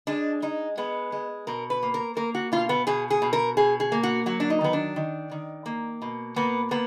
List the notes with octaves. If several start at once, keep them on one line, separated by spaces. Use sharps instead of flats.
G#3 D4
G#3 D#4
G#3 B3
G#3
B2 A#4
B4
A#3
A#4
A#3 A#4
F#4
B2 F4
B3
B2 G#4
G#4
B2
A#4
B2 G#4
G#4
A#3
F#4
F#3 F#4
D4
D#4
D#3 B3
D4
D#3
D#3
A#3
B2
A#3 B3
A#3 B3